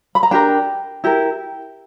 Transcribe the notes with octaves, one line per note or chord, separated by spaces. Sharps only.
B5
A#5
D4 G4 A#4 G5
E4 G4 A#4